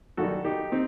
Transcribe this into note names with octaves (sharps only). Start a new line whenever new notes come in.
F#2 D#3 G3 F#4 A4
D#4 G4
C4 D#4